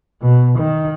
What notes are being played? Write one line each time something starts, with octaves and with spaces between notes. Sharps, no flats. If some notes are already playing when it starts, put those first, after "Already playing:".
B2
D#3